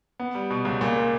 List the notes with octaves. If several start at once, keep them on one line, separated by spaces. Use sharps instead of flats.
B3
G3
B2
C#2
A#2
A#3